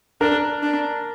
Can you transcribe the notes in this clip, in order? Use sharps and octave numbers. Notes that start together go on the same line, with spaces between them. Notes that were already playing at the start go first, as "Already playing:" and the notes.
D4 A#4
D4